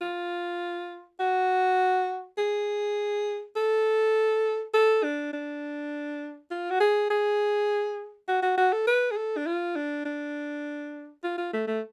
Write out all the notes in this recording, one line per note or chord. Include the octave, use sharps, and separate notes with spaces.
F4
F#4
G#4
A4
A4
D4
D4
F4
F#4
G#4
G#4
F#4
F#4
F#4
A4
B4
G#4
A4
D4
F4
D4
D4
F4
F4
A3
A3